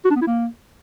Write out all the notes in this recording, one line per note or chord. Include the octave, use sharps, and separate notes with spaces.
F#4
D4
B3
E4
A#3